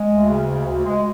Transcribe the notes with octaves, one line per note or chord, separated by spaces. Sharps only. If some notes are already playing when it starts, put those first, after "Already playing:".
Already playing: G#3
D2
C#3
D2
D2
G#3